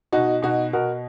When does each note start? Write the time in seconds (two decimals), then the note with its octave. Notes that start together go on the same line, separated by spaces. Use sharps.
0.12 B2 D#4 F#4
0.42 B2 D#4 F#4
0.73 B2 F#4 A#4